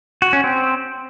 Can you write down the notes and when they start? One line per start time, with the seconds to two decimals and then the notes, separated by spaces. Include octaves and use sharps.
0.22 F#4
0.33 C#4
0.44 C4